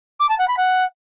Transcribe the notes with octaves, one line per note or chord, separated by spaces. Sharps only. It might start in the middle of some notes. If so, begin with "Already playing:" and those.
D6
A5
F#5
B5
F#5